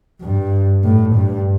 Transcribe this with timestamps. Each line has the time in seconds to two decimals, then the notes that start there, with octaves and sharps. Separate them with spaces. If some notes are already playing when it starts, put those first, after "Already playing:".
0.22 G2
0.84 A2
1.15 G2